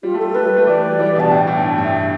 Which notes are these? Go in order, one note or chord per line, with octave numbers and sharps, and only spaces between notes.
G3 F4
A3
A4
G3
A3 B4
G3
A3
E3 G3 D5
E3 G3
B2 D3 A5
A2 G5
A2
G2 A5
G2 G5
E5
E5